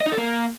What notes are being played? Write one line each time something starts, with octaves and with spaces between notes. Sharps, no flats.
D#5
D#4
A4
A#3